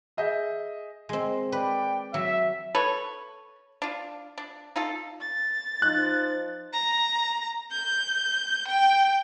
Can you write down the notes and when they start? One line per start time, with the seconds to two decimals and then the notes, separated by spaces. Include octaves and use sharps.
0.17 G#4 D#5 E5 G6
1.09 G#3 C4
1.52 B4 D5 G5
2.14 F#3 E5
2.75 A4 B4 C#5
3.82 D4 F4
4.38 D4
4.76 D#4 F4 A4
5.21 A6
5.82 F3 D#4 F#6
6.74 A#5
7.72 G6
8.68 G5